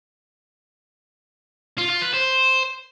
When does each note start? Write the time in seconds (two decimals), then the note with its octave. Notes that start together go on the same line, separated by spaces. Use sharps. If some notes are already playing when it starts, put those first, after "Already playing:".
1.78 F4
1.90 F4
2.02 B4
2.14 C5